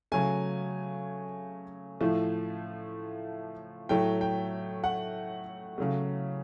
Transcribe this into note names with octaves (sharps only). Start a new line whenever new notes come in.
C#3 F#3 A3 G#5
A2 F3 A3
A2 F#3 A3 G5
G5
F#5
C#3 F#3 A3